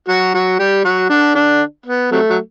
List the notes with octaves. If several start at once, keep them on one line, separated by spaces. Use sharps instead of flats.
F#3 F#4
F#3 F#4
G3 G4
F#3 F#4
D3 D4
D3 D4
B3
C3 F#3 A3
F#3